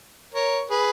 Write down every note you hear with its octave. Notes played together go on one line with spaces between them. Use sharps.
A#4 C#5
G#4 B4